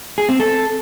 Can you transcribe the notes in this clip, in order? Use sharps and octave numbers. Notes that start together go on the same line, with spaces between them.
G#4
C4
A4